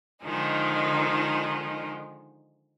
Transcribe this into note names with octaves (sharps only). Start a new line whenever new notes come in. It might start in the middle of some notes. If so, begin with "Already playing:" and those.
D3 D#3 F3 G#3 D#4